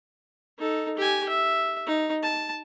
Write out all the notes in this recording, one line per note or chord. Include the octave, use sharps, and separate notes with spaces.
D#4 A4
G4 G#5
E5
D#4
A5